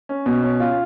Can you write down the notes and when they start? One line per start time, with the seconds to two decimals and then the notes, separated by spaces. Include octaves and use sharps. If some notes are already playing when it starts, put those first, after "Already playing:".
0.09 C#4
0.26 B2
0.43 C#4
0.60 F4